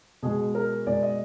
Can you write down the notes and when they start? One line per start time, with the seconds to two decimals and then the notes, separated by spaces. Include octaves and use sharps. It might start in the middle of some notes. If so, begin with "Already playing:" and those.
0.23 B2 G#3 G#4
0.55 A#4
0.87 B2 G#3 D5
1.03 D#5